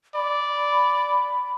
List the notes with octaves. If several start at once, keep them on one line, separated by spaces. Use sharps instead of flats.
D5 B5